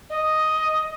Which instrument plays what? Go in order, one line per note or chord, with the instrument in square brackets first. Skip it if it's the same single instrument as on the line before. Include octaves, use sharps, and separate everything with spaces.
[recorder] D#5